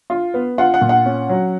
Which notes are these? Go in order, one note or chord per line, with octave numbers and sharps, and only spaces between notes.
F4
B3
F4 F#5
F#5
A#2
F#5
C#4
F#3